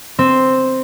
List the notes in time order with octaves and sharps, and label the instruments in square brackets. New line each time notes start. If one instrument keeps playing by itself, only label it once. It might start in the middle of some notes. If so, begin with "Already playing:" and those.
[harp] C4